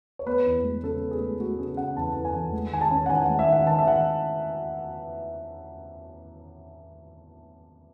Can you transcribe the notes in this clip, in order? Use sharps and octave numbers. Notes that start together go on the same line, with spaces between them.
C#5
B3 B4
E2
G#3
C#3 A4
B3
G#4
G#3
G#3 F#4
C#3 G#4
C#3 F#5
E2 A5
E2
G#5
E2
G#3
D#3 G#5
A5
C#4
F#5
D#3 G#5
F#5
G#3
E5
D#3
F#5
D#3 A5
E5
D#3 F#5